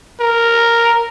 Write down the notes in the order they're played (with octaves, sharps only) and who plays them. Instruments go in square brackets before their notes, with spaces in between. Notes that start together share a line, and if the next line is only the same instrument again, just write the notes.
[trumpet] A#4